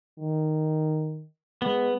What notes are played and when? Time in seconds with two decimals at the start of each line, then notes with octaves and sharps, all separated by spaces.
0.19 D#3
1.62 G#3 B3